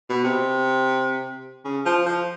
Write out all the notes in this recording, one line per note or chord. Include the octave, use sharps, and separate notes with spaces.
B2
C3
C#3
F3
F3